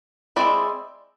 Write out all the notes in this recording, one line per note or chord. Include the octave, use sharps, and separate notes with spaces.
G#3 C4 E4 D5